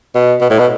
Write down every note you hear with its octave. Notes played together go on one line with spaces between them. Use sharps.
B2
B2
A2
B2